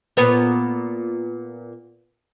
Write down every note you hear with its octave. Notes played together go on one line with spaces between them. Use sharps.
A#2 B3